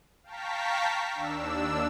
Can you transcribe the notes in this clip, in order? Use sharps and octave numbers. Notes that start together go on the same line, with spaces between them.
F5 G5 A5 A#5 C#6 B6
D#2 D4 E6